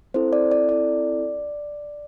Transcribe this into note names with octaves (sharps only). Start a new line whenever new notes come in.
C4 E4 A4 C5
D5
D5
C4 E4 A4 D5